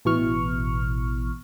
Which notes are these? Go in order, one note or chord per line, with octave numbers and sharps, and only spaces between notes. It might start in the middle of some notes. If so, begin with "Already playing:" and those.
A1 B2 E3 C#6 F6